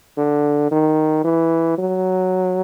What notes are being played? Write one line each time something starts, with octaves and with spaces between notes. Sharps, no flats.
D3
D#3
E3
F#3